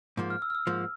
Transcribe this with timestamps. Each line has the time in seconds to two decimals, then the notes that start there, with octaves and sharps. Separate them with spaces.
0.17 G#2 F3 A#3
0.30 F6
0.42 E6
0.50 F6
0.55 E6
0.67 G#2 F3 A#3